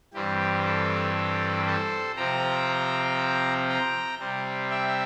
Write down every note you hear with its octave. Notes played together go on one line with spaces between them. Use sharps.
G2 E3 G3 C4 G4
A4
A4
A4 C5
C3 F3 C4 G5 A#5
G5 A#5
C3 G3 C4
E5 G5